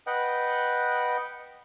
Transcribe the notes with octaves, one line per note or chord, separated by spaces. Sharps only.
B4 D#5 F#5 G5